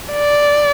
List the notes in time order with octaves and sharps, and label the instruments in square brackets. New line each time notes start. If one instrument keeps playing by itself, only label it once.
[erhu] D5